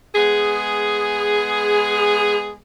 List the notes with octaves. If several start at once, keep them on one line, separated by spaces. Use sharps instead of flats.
G#3 B3 G#4